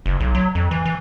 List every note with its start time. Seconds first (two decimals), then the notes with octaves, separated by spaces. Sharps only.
0.06 F#1
0.20 B1
0.35 F#3
0.55 F2
0.71 E3
0.85 E3